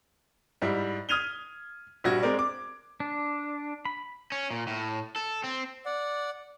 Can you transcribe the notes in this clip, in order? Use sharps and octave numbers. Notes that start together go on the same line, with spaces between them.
G#2 G3 E4
D#6 F6 G#6 D#7 F7 G7
A#1 G3 F#4 G#6
G#3 C4 A#4 D5
D6
D4
B5
C#4
A#2
A2
A4
C4
D5 F#5